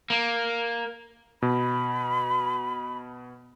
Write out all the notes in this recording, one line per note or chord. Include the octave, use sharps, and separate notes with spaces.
A#3
B2 B5